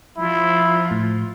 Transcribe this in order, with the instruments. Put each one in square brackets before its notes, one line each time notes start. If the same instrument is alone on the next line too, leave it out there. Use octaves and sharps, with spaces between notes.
[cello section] F3 F4 [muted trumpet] E4
[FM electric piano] A2